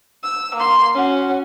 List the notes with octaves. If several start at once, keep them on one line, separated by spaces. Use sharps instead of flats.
E6
A#3 C6
C#4 F#4